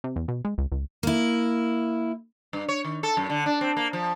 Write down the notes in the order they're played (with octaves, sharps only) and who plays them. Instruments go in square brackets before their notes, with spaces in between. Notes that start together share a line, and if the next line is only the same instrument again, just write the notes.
[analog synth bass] C3
E2
B2
G#3
C#2
C#2
[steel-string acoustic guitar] A#3 E4
[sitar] G2
C#5
D#3
A4
F#2
D3
D4
C4
A#3
F3